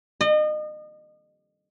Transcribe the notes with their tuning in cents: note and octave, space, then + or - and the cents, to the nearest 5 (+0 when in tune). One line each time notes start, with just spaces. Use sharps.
D#5 -35